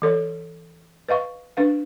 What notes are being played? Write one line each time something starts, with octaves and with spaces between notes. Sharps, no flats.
E3 A4 C#5
B4 D#5 F5 C#6
D4 B4 F5